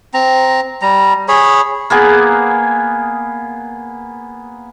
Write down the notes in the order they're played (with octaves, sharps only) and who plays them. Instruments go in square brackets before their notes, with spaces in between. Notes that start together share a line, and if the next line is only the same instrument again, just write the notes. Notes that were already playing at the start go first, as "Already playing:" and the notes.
[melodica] C4 A#5
G3 A#5
G#4 C#5 B5
[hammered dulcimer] A#3 B3 G#4